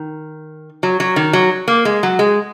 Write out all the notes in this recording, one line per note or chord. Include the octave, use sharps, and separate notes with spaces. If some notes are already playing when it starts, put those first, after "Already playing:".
Already playing: D#3
F#3
F#3
D#3
F#3
A#3
G#3
F#3
G#3